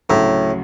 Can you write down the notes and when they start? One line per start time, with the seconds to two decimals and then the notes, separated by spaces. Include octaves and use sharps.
0.09 D2 A2 C#3 F#3